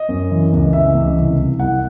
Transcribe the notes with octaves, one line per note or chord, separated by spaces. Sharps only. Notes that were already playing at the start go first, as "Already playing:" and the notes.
Already playing: D#5
F#2
E3
C#2
E3 E5
C#2
C2
C3
C2 F#5